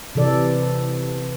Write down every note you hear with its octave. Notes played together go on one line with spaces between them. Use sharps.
C3 E3 A4 D5